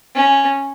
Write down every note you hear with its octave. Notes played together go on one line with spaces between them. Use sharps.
C#4